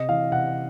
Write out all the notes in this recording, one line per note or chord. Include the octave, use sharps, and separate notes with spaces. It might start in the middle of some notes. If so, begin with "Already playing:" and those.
Already playing: C3 D#5
E3 F5
C3 F#5